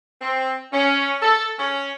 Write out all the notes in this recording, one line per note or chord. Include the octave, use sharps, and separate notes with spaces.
C4
C#4
A4
C#4